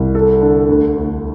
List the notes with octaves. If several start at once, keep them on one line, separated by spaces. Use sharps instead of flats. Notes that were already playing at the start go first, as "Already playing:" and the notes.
Already playing: C2
A4
D3
D2
D2